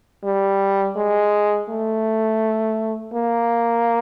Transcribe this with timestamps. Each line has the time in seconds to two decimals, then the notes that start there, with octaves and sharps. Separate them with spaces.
0.24 G3
0.96 G#3
1.69 A3
3.14 A#3